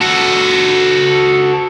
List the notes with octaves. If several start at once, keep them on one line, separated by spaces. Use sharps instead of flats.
F#4 A4